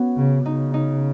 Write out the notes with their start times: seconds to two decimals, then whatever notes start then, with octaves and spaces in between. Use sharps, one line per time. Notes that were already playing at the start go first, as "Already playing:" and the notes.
Already playing: B3 C#4 F#4
0.17 C#3
0.45 C#3 D#4
0.74 D#4